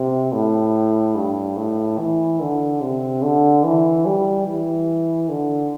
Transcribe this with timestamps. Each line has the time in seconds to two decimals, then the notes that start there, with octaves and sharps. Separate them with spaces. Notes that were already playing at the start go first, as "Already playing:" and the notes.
Already playing: C3
0.33 A2
1.15 G2
1.57 A2
1.98 E3
2.41 D3
2.81 C3
3.23 D3
3.64 E3
4.06 G3
4.47 E3
5.29 D3